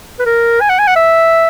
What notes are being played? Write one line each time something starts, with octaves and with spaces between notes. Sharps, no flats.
B4
A#4
G#5
F#5
G#5
F#5
E5